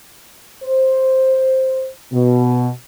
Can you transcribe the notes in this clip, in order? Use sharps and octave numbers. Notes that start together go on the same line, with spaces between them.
C5
B2